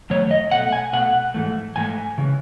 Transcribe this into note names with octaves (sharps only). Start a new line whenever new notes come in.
F#2 D#3 A3 C#5
D#5
B2 A3 F#5
G#5
B2 A3 F#5
G#2 E3 A3
G#2 E3 A3 G#5
C#3 E3